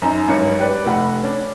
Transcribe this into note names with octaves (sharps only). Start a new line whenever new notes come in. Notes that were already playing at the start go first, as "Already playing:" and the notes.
F#2 D#4 A#5
G#1 G2 F#3 C#4 C#7
G4 B4 D5
F1 F#5 B5
C#4 D4